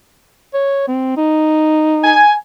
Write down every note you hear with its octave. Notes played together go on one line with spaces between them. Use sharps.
C#5
C4
D#4
G#5